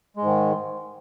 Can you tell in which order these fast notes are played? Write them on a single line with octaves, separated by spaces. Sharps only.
G#3 G#2 D#3